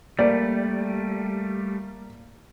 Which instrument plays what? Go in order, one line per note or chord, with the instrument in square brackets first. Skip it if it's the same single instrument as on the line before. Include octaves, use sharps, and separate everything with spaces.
[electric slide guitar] G3 A3 [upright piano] A#3 D5